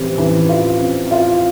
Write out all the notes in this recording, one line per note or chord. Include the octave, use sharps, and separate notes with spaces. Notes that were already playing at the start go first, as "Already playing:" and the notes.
Already playing: E3 G3 C4
E3
F4
C4
F4